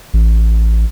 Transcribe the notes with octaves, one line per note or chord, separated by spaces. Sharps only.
A1